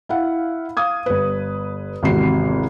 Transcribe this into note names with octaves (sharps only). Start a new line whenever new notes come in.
E4 F5 F#5
F5 D#6 G#6
G1 B4
G#1 E2 C3 F#4 C7